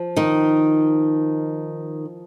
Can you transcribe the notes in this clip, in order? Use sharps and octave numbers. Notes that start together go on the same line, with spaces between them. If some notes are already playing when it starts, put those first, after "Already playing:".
Already playing: F3
D#3 D#4